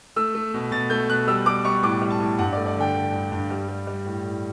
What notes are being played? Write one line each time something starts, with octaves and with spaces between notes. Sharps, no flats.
A3 E6
A3
B2
B2 A6
A3 G6
B2 F#6
G3 E6
G3 D6
G3 C#6
A2 D6
G3
A5
A2
G2 F#5
D5
A3
D5
D3 G5
D3
G2
G2
G3
G3
G3
A2
A2